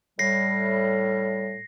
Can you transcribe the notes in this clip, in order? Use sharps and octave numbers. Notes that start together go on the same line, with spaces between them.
A2 G3 A#6 C7